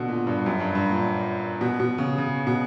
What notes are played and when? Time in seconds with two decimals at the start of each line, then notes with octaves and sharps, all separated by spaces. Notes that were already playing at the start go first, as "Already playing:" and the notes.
Already playing: B2 D3
0.08 A#2
0.27 G2
0.46 F#2
0.60 G2
0.75 G2
0.89 A#2
1.61 B2
1.80 B2
1.98 C#3
2.18 C#3
2.47 B2